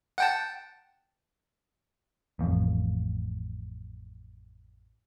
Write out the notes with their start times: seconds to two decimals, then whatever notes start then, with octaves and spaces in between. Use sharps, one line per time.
0.18 F#5 G5 A5
2.39 A1 F2